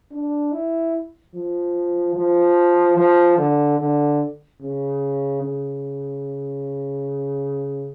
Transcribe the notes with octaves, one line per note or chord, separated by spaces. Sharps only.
D4
E4
F3
F3
F3
D3
D3
C#3
C#3